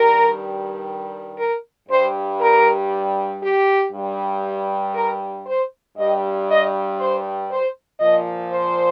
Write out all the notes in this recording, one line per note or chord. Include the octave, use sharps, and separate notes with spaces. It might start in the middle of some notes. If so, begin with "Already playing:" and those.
Already playing: G2 D#3 G3 A#4
A#4
G2 G3 C5
A#4
G4
G2 G3
A#4
C5
G2 G3 D#5
D#5
C5
C5
A#2 F3 D#5
C5